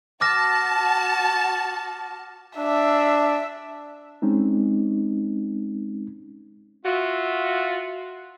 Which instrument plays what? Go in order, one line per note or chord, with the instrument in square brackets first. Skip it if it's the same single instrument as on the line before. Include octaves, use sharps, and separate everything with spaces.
[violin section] F#4 A5 [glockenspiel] D6 F6 A#6
[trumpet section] D4 [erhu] E5
[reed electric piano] G#3 C4 C#4 D#4
[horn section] F4 F#4 E5